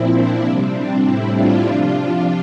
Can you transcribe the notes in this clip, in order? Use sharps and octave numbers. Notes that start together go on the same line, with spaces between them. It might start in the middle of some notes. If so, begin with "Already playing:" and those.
Already playing: A#2 F3 C4 E4
D4
C3 G3 C4
D4
A2 G3 C4 E4
D4 F4
C3 F3